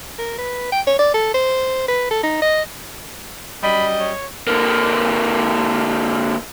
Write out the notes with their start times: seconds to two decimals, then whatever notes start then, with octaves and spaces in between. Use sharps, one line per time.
0.19 A#4
0.38 B4
0.72 G5
0.87 C#5
0.99 D5
1.14 A4
1.34 C5
1.88 B4
2.11 A4
2.23 D#4
2.42 D#5
3.63 F#2 G3 D#5 B5
4.00 C#5
4.47 D3 A#3